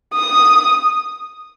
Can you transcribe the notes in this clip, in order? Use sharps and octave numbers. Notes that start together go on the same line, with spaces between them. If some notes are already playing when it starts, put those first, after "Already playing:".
D#6